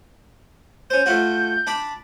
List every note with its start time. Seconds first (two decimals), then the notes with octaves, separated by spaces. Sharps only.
0.90 C#4 C5 G6
1.06 A3 F4 F#4
1.67 D4 D5 B5